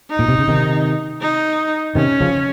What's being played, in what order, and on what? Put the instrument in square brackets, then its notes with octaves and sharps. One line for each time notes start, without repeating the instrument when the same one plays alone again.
[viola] D#4
[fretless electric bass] A#2
C3
C#3
C3 D#3
[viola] D#4
[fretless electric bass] C3 D#3 [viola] C#4
[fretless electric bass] C#3 F3